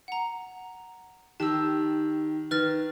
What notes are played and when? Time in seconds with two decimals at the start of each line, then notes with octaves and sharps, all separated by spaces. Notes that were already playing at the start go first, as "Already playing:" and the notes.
0.08 F#5 A#5
1.40 D#3 G4 A5 E6
2.51 D#3 B4 F6 A6